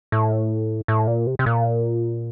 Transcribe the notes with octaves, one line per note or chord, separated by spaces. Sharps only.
A2
A2
A#2
C3
C3
A#2